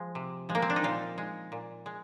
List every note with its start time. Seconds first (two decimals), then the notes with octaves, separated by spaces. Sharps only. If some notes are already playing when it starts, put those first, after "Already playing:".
Already playing: F3 G#3
0.15 C3
0.49 F3 G#3
0.55 A#3
0.62 C4
0.70 D4
0.76 D#4
0.84 A#2 F4
1.18 G#3
1.52 A#2
1.86 G#3